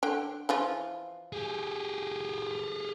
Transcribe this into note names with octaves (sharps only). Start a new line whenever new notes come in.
D3 G5
E3 F3 F4
G4 G#4